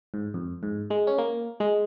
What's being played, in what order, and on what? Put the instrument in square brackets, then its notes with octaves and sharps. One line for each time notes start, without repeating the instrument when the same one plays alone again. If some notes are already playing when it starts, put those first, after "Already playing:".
[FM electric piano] G#2
F2
G#2
G#3
C#4
A#3
G#3